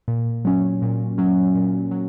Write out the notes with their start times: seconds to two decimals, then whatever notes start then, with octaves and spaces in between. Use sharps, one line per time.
0.08 A#2
0.45 F#3 C#4
0.82 A#2
1.18 F#3 C#4
1.55 A#2
1.91 F#3